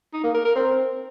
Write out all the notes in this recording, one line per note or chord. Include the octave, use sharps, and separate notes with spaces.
D#4
A#3
A#4
A#4
C4